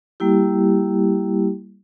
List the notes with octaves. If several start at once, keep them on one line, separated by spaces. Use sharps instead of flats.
G3 A#3 E4 G4